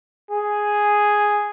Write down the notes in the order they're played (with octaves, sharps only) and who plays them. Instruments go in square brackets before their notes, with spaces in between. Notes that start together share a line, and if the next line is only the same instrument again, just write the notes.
[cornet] G#4